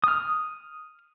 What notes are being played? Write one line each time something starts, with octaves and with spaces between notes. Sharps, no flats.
D#6 F6